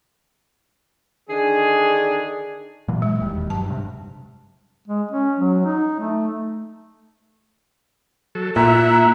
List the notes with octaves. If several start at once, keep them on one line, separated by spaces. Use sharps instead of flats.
D3 D#3 D4 G#4
A#2 E3 F#3
G#3
E1 D#2 G3
G2 F#3 A5
G2 C3
G#3
C#4
F#3
D#4
A3
F#3 A4
A#2 E4 E5 F#5 A#5